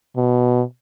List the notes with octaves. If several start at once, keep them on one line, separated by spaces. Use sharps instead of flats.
B2